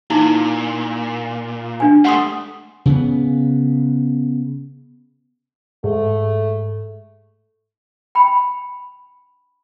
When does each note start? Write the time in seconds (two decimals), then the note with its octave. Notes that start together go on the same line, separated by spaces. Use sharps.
0.10 A#2 D#4 E4
1.80 D4 G#5
2.05 G3 A3 F#5 C6 D#6
2.86 C#3 B3
5.84 G#2 A3
8.15 G5 B5